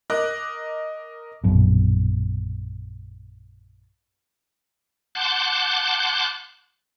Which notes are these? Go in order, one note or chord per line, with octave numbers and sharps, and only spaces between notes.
A#4 D#5 D6 F#6
A#1 F#2 B2
F#5 A5 C6 D6 F#6 G6